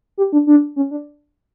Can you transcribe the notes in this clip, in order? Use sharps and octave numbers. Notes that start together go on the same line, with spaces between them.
G4
D4
D4
C#4
D4